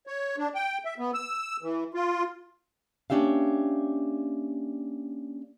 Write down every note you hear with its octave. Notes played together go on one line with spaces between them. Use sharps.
C#5
D4
G5
E5
B3
E6
E3
F4
A#3 C#4 D4 G4 E5 F5